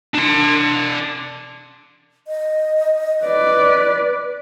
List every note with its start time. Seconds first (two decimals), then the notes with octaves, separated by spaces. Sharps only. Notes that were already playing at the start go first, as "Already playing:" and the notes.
0.15 D4 C6
2.27 D#5
3.24 B4 D5